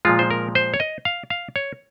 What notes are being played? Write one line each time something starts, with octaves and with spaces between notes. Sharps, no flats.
A#2 F3 G#3 F4
C5
A#4
C5
C#5
D#5
F5
F5
C#5